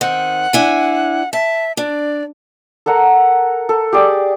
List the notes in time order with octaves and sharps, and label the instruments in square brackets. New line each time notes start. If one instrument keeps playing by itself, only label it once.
[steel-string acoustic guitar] D#3 C4 [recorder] F#5
[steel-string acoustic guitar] D4 E4 G#5
[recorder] E5 [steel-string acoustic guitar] A5
[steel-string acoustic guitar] D4 [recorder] D5
[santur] A4 A#4 F#5 A#5
A4
G4 G#4 D5 G5